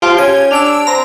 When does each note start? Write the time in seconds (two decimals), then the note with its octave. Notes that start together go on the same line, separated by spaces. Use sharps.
0.02 F4 G4
0.18 C#4 G#6
0.51 D4 E6 D7 F7
0.87 C4 A#5